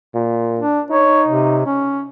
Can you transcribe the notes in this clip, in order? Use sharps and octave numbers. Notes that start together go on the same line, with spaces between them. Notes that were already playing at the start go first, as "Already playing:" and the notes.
A#2
D4
D#4 C#5
C3
C#4